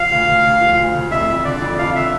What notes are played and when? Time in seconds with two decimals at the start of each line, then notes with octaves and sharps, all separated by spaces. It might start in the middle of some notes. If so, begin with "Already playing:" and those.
Already playing: F3 F5
0.11 D2
0.28 D2
0.44 D2
0.61 F3
0.77 D2
0.95 D2
1.11 F2 E5
1.29 F2
1.44 D3 D5
1.61 F2
1.78 F2 F5
1.95 D3 E5